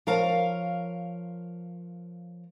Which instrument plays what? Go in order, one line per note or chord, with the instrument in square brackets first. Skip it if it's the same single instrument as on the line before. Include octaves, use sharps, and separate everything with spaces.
[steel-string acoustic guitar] F3 A#4 C#5 F5 A#5